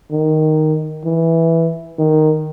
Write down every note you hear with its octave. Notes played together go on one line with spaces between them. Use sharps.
D#3
E3
D#3